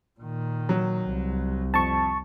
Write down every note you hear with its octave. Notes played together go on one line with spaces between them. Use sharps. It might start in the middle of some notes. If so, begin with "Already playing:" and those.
A#2 D#3
F#3
C2
F2 A5 C#6